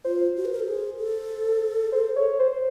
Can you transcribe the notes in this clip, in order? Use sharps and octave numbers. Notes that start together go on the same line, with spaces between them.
F4 C5
F#4
B4
A#4
A4
G#4
A4
C5
C#5
C5